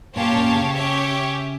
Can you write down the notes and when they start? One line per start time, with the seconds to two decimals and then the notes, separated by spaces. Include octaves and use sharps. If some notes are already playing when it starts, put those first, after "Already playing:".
0.16 A#2 C#4 G4 C#5 F5 A5
0.35 A#2
0.54 C#3
0.74 C#4 G4 C#5 E5